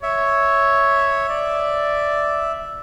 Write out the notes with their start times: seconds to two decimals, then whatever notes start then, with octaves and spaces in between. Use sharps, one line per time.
0.03 C#5 E5
1.29 D5